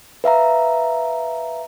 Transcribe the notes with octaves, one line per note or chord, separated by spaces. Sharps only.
B4 E5 F5 A#5